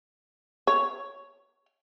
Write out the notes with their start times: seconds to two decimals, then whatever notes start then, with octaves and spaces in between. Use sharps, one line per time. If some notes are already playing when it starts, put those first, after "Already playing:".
0.67 C#5